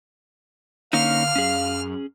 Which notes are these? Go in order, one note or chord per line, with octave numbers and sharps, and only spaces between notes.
D3 A#3 C#4 D#4 F5 F6
F#2 C#4 G#4